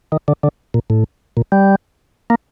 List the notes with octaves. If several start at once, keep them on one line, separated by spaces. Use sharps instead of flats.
D#3
D3
D3
A#2
A2
A#2
G3
A#3